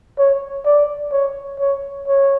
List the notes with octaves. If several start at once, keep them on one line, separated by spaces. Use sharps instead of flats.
C#5
D5
C#5
C#5
C#5